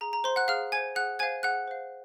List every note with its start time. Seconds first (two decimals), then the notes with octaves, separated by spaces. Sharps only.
0.01 G#4 A#5
0.13 A#5
0.24 C5 F5 C6
0.36 F#5 F#6
0.48 G#4 F5 F6
0.72 C5 F5 G#5 G#6
0.95 G#4 F#5 F#6
1.19 C5 F5 G#5 G#6
1.43 G#4 F#5 F#6
1.68 C5 F5